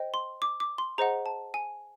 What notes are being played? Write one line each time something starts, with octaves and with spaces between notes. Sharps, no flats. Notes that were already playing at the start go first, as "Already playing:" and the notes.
Already playing: C5 D#5 G5
C6
D6
D6
C6
G#4 C5 D#5 F#5 A#5
A5
G#5